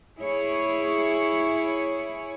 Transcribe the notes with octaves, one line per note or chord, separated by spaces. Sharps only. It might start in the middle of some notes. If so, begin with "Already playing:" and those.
E4 G#4 C#5